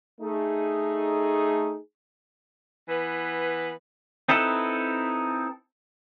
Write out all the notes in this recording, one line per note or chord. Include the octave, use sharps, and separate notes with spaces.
A3 D#4 G#4
E3 B3 B4
C4 D#4 E4 A4 B4